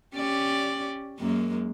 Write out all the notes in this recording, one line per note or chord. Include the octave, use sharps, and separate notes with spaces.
C#4 G4 D5
F#2 G#3 A#3